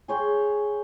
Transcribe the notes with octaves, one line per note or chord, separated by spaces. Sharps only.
G#4 C#5 G5 C6